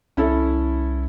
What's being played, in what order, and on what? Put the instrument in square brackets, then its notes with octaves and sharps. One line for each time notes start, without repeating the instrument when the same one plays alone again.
[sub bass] C2 [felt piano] C#4 E4 A4